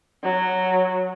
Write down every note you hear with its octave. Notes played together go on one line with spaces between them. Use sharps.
F#3